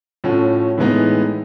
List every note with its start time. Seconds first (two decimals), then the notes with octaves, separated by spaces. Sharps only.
0.24 A2 F3 A3 C#4 F#4
0.78 A2 E3 G#3 B3 D#4